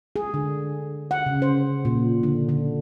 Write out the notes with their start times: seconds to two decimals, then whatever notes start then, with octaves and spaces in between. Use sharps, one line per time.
0.16 G#4
0.34 D3
1.11 F#5
1.26 C#3
1.42 C5
1.85 A#2
2.23 D3
2.49 D3